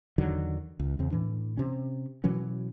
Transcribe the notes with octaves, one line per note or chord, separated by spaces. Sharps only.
E2 D3 D#3 F#3
C#2
E2 C#3 C4
A2 E3 D4
C3 C#4
B2 E3 F#3 C#4